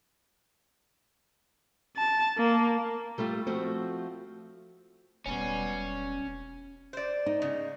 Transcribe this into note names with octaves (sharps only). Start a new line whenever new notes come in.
A5
A#3
G3 A3 F4 G4
F3 A3 C4 F#4
E1 B2 G3 C#4
C5 D5
D#4
C#3